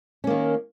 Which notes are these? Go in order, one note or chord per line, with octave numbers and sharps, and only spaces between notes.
D#3 A#3 C#4